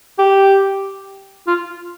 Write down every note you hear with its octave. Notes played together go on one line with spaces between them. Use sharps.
G4
F4